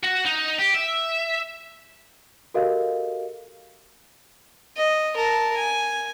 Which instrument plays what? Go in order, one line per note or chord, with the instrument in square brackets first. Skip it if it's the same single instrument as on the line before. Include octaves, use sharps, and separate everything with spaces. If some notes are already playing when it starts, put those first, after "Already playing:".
[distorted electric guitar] F#4
D#4
G4
E5
[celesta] F#4 G4 A4 A#4 D#5 F5
[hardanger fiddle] D#5
A#4 A5
G#5